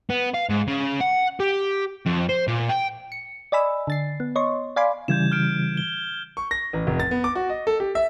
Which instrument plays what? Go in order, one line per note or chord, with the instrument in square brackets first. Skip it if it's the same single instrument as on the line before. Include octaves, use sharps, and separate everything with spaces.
[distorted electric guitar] B3
F5
G#2
C#3
F#5
G4
F2
C5
A#2
G5
[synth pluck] C#7
D5 D#5 G#5 B5 E6
D3 A6 C7
B3
C#5 D#5 C6 C#6
D5 F5 G#5 B5 C6 D6
[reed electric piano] C#3 E3 G3 [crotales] G6 G#6 E7
[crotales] F6 G6 D7
G7
[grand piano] C#6
A#6
A1
F1
A6
B3
D6
F#4
D#5
A4
G4
E5